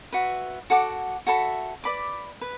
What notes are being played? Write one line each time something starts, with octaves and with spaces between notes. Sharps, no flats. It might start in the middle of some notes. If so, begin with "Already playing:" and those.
F#4 B4 E5
F#4 A4 F#5 D6
F#4 A4 E5 B5
B4 D5 B5 D6
B4